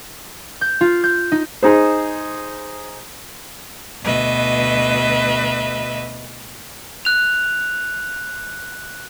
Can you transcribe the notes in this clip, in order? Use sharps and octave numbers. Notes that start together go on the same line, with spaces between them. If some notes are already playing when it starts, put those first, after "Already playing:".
G6
F4
G6
D#4
D#4 G#4 C5
D2 B2 B4 D#5 E5
F#6 F7